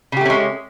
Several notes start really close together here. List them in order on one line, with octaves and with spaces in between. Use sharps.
C#3 G4 A3 C#4 G#3